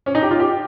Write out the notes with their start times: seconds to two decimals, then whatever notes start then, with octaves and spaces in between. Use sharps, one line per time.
0.06 C#4
0.15 D#4
0.22 G4
0.31 F4
0.40 G4